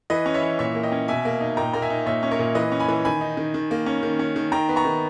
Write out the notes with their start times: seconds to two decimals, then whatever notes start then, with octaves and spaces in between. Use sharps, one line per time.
0.10 E3 B4 D#5
0.26 C#4
0.34 C#5 E5
0.42 E3
0.59 A#2 C#5 E5
0.75 A#3
0.83 D#5 G5
0.92 C#4
1.08 B2 E5 G#5
1.25 A#3
1.41 D#4
1.57 A#2 G5 A#5
1.73 A#3 A#5
1.82 E5 G#5
1.90 D#4
2.06 A#2 C#5 E5
2.23 C#4
2.31 A#4 C#5
2.39 A#2
2.55 E3 B4 D#5
2.72 C#4
2.80 G#5 B5
2.89 E3
3.05 D#3 G#5 B5
3.21 D#4
3.37 D#3
3.54 D#3
3.71 A#3
3.86 C#4
4.03 D#3
4.19 C#4
4.36 D#3
4.52 D#3 G5 A#5
4.69 B3
4.76 A#5 C#6
4.85 D#3